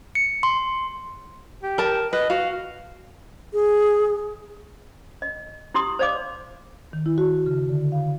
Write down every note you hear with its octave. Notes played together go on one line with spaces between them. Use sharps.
C#7
C6
G4
A#4 A5
B4 D#5
F#4 F5
G#4
D#5
E4 G4 C6 D#6
C5 D5 D#5 F5 D6
D#3
E4
F#4
C#3
D3
F5